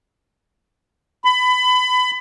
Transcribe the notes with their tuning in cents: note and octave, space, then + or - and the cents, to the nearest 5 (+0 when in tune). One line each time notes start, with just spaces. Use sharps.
B5 +25